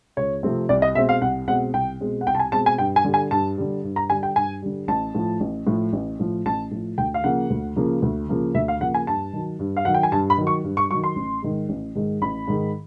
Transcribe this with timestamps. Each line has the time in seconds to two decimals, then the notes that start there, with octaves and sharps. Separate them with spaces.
0.17 C#2 C#5
0.43 C3 F3 A3 C4
0.69 C2 D5
0.82 D#5
0.95 B2 G#3 C4 E5
1.09 F5
1.22 C2 F#5
1.48 B2 G#3 C4 F#5
1.74 C2 G5
2.00 B2 G#3 C4
2.21 F#5
2.27 C2 G5
2.35 A5
2.40 G#5
2.52 B2 G#3 C4 A5
2.66 G#5
2.78 G2 G5
2.96 G#5
3.05 D3 G3
3.14 G#5
3.31 G2 A5
3.58 D3 G3
3.84 G2
3.96 A#5
4.10 D3 G3 G#5
4.23 G5
4.36 G2 G#5
4.62 D3 G3
4.88 A1 A5
5.15 A2 F3
5.40 A1
5.67 A2 F3
5.93 A1
6.19 A2 F3
6.45 A1 A5
6.71 A2 F3
6.98 D2 G5
7.14 F5
7.24 C#3 F3 A#3 F#5
7.50 D2
7.76 C#3 F3 A#3
8.02 D2
8.29 C#3 F3 A#3
8.54 D2 E5
8.68 F5
8.81 C#3 F3 A#3 F#5
8.94 G#5
9.07 G2 A5
9.33 D#3 F#3
9.59 G2
9.77 F5
9.85 D#3 F#3 F#5
9.94 G5
10.03 G#5
10.12 G2 A5
10.30 B5
10.38 D#3 F#3
10.47 C#6
10.64 G2
10.77 C#6
10.91 D#3 F#3 C#6
11.04 C6
11.16 A1
11.42 G#2 D#3 G#3
11.69 A1
11.95 G#2 D#3 G#3
12.22 A1 B5
12.48 G#2 D#3 G#3